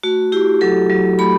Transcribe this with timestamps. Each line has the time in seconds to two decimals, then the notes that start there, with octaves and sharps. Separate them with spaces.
0.03 A3 F#4
0.32 E4 G4
0.61 F#3 A4
0.89 F#3
1.19 A3 B5